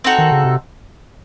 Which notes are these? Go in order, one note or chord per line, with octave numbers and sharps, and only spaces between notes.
C4 D#4 F#4 A4
D#3
C#3
C3